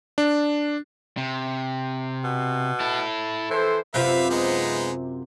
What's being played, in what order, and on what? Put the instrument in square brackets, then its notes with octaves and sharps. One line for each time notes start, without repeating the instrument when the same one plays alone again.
[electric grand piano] D4
[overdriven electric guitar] C3
[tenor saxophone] B2
[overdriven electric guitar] E4 A4
[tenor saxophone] E3 [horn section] A4 C5
[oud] F#2 C3 F4 [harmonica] B4 E5 F5
[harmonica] G#3 B3 D#4